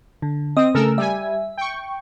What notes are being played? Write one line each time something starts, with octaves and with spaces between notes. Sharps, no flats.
D3
C4 D#5 D#6
C#3 A3 A4 A#4 E6
G3 E5 G#5
G5 C#6